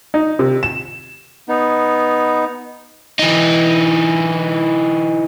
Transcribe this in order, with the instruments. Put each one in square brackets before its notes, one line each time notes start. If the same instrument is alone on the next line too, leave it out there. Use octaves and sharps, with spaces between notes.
[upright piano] D#4
C3
E7
[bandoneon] B3 D#4
[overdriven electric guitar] E3 D#4